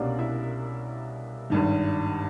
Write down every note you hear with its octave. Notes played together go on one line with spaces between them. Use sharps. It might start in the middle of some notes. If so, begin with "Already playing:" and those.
Already playing: C2 B2 G3 A#3 C#4 D4 D5
E4 E5
G#1 G2 D#3